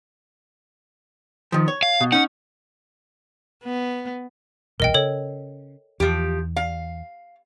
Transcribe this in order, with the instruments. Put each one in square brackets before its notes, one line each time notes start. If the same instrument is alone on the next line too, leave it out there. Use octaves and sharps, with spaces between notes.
[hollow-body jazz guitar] D#3 F3
C#5
[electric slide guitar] F5
[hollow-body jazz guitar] B2
[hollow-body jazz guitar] C#4 D#4 [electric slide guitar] F#5
[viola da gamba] B3
[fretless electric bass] D#1 B1 E2 [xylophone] A#4 D#5 G5
[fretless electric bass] C#3 [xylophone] A4 C#5
[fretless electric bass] E2 [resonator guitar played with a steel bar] F3 G4
[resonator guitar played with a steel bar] F5